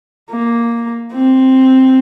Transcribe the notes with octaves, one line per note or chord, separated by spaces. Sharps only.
A#3
C4